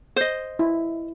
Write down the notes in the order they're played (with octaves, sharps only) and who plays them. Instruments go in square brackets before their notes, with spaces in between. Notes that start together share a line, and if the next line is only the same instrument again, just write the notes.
[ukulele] C5 D#5
[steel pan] E4